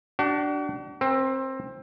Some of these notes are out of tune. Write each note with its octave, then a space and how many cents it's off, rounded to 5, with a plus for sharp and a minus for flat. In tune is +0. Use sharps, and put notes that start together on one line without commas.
D4 +0 F#4 +45
C4 +20 B4 -30